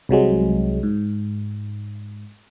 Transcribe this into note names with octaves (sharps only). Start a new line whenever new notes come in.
C2 C3 F#3 G#3
G#2